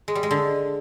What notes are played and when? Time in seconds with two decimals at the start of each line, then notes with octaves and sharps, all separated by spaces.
0.08 G#3
0.15 G3
0.23 G#3
0.31 D3